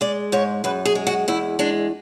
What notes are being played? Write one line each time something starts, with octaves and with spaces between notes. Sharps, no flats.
G#3 D5
G#2 C#5
F#2 B4
G#4
G#3
F#4
E2 E4
G#3 D4